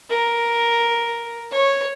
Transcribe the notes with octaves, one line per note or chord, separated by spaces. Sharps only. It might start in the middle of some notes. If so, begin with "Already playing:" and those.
A#4
C#5